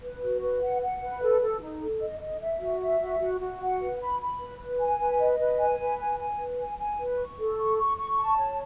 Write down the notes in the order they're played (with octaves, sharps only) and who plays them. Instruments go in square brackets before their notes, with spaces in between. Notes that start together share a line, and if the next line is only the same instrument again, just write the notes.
[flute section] B4
F#4
B4
F#5
F#5
B4
A4
A4
D#4
A4
D#5
D#5
E5
F#4
E5
F#4
F#4
F#4
F#5
B4
B5
B5
B4
B4
G#5
B4
D#5
B4
G#5
B4
G#5
G#5
B4
G#5
G#5
B4
C#6
A4
C#6
C#6
C#6
A5
C#5